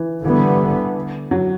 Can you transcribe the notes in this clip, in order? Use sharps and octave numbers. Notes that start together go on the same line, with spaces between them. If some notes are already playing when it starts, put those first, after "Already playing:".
Already playing: E3
D3 E3 G3 B3
F#3